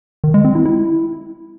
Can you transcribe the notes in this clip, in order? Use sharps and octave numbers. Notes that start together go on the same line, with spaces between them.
D#3
G#3
C4
E4
E4